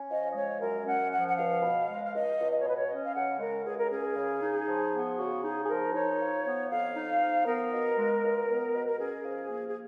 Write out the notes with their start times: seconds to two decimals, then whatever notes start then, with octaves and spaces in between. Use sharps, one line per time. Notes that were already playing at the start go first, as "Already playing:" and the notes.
Already playing: C#4
0.10 F3 D#5
0.32 D#5
0.35 G#3 C#5
0.61 F#2 A#4
0.86 C#4 F#5
1.12 F3 F#5
1.28 F#5
1.37 C#2 F5
1.63 B2
1.88 G#3
2.05 F5
2.14 C#2 D#5
2.39 C#2
2.51 D#5
2.61 B2 C#5
2.69 B4
2.77 C#5
2.90 C#4 D#5
3.04 F5
3.15 C#3 F#5
3.40 G#3 A#4
3.65 C#2 G#4
3.78 A#4
3.90 C#4 G#4
4.16 C#3
4.42 D#4
4.67 F3
4.93 B3
5.18 C#3 F#4
5.44 D#4 G#4
5.65 G#4
5.69 F3 A#4
5.94 D#4 C#5
6.19 F3
6.45 B3
6.71 F2 F5
6.96 D#4
7.22 F3
7.46 B3 A#4
7.73 B2
7.98 G#3
8.23 C#2
8.48 B3
8.73 B2 B4
8.87 A#4
8.99 C#4 G#4
9.25 F3
9.50 A#3
9.69 G#4